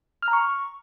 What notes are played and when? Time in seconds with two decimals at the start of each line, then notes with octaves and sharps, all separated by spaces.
0.22 F6
0.28 A#5
0.33 C#6